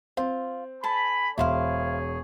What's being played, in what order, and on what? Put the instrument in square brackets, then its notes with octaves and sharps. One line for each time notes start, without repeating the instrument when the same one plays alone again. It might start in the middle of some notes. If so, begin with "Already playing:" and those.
[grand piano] C4 [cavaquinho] F4
[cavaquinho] A4 A5 [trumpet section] G#5 B5
[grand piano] E1 [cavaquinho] E4 C5 F5 [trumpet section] G#4 C#5